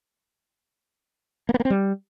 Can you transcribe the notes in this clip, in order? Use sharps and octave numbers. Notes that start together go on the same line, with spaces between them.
A#3
B3
A#3
C4
G3